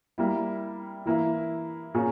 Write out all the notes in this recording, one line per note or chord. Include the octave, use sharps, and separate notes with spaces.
G3 A#3 E4
E3 A#3 E4
A#2 A#3 C#4 G#4